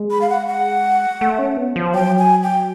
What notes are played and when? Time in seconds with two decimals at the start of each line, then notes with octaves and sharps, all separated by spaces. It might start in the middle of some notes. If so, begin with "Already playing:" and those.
Already playing: G#3
0.11 B5
0.21 F5
0.30 F#5
0.48 F#5
1.21 A3
1.39 C#4
1.57 B3
1.76 F3
1.94 F#3 G5
2.19 G#5
2.43 G5